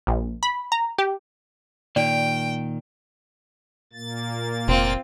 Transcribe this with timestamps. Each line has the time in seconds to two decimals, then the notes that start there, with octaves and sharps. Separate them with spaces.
0.07 A#1
0.43 B5
0.72 A#5
0.98 G4
1.96 A#2 D#3 D5 G5
3.93 A#2 A#3 A6
4.68 F1 C4 F4